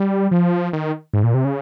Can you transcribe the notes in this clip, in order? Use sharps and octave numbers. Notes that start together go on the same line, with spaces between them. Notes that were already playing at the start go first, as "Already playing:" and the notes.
Already playing: G3
F3
D#3
G#2
A#2
C3
C#3